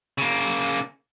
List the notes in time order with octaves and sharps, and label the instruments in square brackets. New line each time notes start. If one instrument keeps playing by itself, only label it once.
[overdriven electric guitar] C#3 A#3